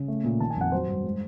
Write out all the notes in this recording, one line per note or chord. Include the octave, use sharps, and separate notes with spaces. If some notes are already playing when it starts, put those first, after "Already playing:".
Already playing: C#3
A3
A#2
D#3 A5
G#5
F2 F#5
F#3 C5
G2
G#3